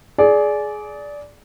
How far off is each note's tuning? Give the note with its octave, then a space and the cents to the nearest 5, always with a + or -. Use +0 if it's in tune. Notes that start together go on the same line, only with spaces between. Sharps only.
G#4 +20 D5 -10